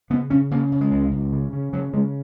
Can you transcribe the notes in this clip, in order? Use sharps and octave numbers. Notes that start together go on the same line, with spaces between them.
C#3 B3
C#3 C#4
C#3 A#3
C#3
G#3
C#2
C#2
C#3
C#3
C#3 F#3
C#3 G#3